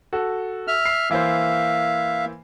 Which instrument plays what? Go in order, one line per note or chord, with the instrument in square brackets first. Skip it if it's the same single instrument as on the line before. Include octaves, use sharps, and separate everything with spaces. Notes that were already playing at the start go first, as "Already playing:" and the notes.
[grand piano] F#4 A4
[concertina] E5 F6
[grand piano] C7
[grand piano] E3 A#3 C5 [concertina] E5 F5